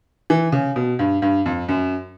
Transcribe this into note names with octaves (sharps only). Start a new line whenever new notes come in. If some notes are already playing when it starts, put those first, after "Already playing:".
E3
C#3
B2
G2
G2
F2
F#2